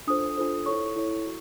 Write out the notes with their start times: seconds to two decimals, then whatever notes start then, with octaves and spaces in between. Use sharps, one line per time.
0.07 D4 F4 A4 C5 D#6
0.37 D4 F4 A4 C5
0.66 E4 A4 C#5 C#6
0.96 E4 A4 C#5
1.25 F#4